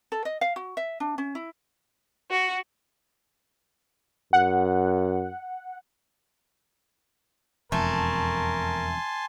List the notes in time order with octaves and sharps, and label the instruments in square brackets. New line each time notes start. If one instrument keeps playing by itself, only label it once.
[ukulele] A4
D#5
F5
F#4
E5
D4
C#4
E4
[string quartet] F#4
[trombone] F#2 [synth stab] F#5
[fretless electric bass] E1 F2 [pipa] A3 [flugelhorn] A#4 [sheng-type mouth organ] G#5 A5 C6